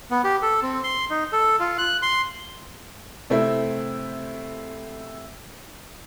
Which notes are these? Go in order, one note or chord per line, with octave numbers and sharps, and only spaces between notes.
B3
G4
A4
C4
C6
D#4
A4
F4
F#6
C6
C3 A3 C4 E4